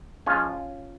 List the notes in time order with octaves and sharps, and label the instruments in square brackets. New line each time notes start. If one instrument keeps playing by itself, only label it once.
[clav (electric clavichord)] F3 G#3 C#4 F4